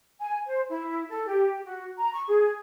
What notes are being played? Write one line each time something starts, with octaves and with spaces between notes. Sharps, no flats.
G#5
C5
E4
A4
G4
F#4
A#5
C#6
G#4